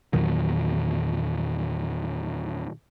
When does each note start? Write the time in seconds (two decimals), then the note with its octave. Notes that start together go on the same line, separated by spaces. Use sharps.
0.13 E2 A#2 D#3 F#3